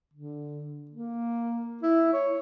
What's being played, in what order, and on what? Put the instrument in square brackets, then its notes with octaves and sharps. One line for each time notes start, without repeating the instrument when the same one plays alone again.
[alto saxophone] D3
A#3
E4
C#5